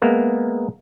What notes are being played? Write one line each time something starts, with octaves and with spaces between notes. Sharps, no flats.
G#3 A#3 B3 A#4 E5